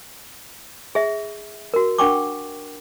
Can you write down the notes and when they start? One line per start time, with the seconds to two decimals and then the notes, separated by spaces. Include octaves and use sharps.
0.95 G#4 E5
1.74 F#4 A#4
1.98 D4 A#4 F#5 G5 C#6 D6